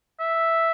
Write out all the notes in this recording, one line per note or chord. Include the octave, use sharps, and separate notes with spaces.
E5